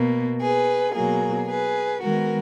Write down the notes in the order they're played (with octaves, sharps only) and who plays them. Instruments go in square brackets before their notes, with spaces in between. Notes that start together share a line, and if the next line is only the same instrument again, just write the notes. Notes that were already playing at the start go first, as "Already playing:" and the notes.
Already playing: [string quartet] B2 A#3
G#4 B4
B2 F#3 A#3 G#4
G#4 B4
D#3 G#3 B3 F#4 A#4